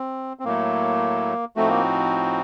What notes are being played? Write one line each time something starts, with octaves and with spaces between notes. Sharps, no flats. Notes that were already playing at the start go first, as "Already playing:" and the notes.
Already playing: C4
C4
A2 F#3 A3 A#3
A2 F3 A3 C4 D#4 F#4
A#3